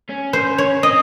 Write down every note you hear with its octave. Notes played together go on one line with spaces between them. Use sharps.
C#4
C5
C#5
C4 D#5